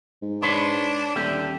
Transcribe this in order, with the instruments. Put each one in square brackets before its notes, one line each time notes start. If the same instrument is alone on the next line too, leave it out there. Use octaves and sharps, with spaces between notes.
[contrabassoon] G#2
[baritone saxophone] D4 [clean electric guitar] B4 C#5 C6
[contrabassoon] D#1 [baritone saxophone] D3 [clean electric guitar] G4 E5